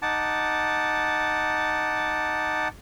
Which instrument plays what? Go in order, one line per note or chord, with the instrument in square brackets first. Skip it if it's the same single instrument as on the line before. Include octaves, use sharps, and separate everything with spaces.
[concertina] D#4 F#5 A5 D6